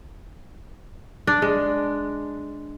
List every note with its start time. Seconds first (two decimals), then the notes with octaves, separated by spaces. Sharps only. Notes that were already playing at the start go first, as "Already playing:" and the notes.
1.27 D4
1.42 G#3